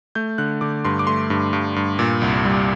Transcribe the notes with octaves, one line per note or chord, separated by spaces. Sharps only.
A3 G6
D3 F#6
D3 D6
G2 C6
D6
A3 C6
G2
G2
G2
A#2
C2
G3